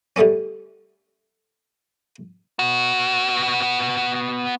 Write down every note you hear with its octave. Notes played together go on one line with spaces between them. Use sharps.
D3 G3 A3 B3 C#4
B3 F#4